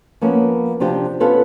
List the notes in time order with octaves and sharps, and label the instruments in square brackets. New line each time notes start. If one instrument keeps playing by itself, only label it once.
[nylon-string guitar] F3 A#3 B3 C#4
C3 F3 D4 F4 G4
B3 C#4 F4 A4 B4